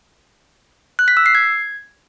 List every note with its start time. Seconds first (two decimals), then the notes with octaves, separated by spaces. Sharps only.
0.99 F#6
1.08 B6
1.17 E6
1.26 C7
1.35 G#6